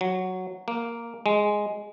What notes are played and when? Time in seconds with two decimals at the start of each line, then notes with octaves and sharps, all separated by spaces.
0.01 F#3
0.68 A#3
1.26 G#3